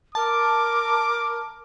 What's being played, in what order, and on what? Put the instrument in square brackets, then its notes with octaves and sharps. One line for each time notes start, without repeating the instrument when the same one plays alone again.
[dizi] A#4 [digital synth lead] A5 [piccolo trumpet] D6